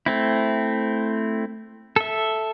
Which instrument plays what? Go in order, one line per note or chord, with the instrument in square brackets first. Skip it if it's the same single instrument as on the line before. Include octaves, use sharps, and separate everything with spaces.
[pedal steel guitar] A3 C4 E4
A4 E5